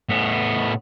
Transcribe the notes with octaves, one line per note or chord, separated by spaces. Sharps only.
A2 B3